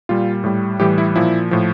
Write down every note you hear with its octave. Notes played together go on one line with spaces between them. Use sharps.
A#2 G3 F4
A2 G3
A2 E3 G3 G4
E4
A#2 F3 E4
A2 F3